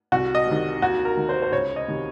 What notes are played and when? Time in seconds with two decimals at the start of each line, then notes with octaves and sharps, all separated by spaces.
0.12 C2 F#4
0.35 D#5
0.47 C3 D#3
0.82 D#2 F#4
1.05 A#4
1.17 D#3
1.29 C5
1.42 C5
1.52 C#2 C#5
1.76 D#5
1.88 C3 D#3